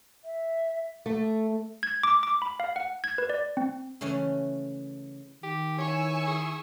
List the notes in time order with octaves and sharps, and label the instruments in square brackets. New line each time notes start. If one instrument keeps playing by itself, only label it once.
[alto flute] E5
[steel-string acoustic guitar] A3
[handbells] G#6
D6
D6
B5
F5
F#5
G#6
B4
D5
C4
[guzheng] C#3 E3 A3 C#4
[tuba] D#3 [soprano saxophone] G4
[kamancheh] E4 C#6 [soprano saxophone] C#5 [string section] G#5 E6
[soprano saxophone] G#4